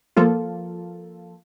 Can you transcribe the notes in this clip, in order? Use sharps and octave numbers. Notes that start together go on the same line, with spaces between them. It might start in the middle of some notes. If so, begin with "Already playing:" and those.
F3 A#3 F4 A4